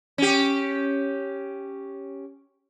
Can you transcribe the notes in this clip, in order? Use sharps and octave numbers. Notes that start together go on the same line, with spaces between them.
C#4 G4